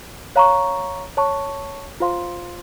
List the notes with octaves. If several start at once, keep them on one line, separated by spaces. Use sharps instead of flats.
C#5 F5 A#5 C#6
C#5 A5 C#6
F4 C5 F5 C6